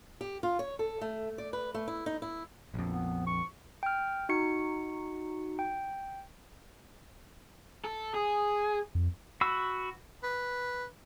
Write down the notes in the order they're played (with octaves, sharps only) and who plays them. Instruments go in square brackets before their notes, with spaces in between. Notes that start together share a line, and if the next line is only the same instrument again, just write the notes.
[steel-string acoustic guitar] G4
F4
C#5
A4
A3
D5
B4
A3
E4
D#4
E4
[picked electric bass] A#1 F2
[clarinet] B3
C#6
[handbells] G5 F6
D#4 F#4 C#7
G5
[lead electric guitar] A4
G#4
[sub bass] F2
[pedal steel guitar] F#4 B5 E6
[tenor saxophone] B4